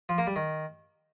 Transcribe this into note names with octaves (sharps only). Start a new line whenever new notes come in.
F3
A#3
G3
D#3